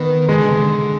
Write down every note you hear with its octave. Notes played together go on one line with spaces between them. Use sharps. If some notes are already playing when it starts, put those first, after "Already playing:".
Already playing: D#3 B3
D#3 G#3
D3
C3
D3